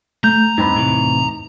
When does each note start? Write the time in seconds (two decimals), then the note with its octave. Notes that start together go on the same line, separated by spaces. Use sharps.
0.24 A3 A#5 G6
0.58 E2 G2 C4 D#4 B4
0.75 A2 C3 E3